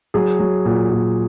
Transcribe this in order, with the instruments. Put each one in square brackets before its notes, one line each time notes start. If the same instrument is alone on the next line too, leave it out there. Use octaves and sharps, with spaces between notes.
[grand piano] F#3 G#4
F#3
A#2 F#4
A#2